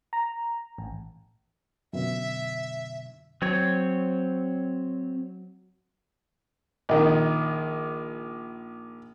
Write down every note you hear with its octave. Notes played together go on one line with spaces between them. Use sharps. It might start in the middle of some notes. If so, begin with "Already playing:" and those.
A#5
A1
F#2 B2 D3 E5
F#3 C4 C#5
A#1 D#3